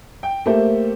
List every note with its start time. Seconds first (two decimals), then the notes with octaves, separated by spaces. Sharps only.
0.23 G5
0.46 A3 A#3 G4 A4 C5